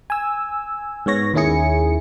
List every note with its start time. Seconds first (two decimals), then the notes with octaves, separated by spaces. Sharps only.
0.10 G#5 E6
1.06 G#2 B3 C#5 A#6
1.34 D#2 D#3 C#4 E4 G#4 C#7